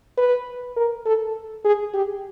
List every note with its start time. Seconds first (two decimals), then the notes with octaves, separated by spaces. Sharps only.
0.18 B4
0.77 A#4
1.06 A4
1.65 G#4
1.94 G4